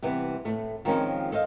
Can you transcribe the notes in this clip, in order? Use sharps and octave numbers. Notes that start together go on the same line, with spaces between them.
C3 E3 G3 B3
A2 A3
D#3 F3 G#3 A#3 C4 C#4
A4 C5 D#5 F5